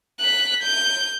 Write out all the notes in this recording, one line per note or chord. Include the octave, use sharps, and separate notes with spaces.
F#6 B6
G6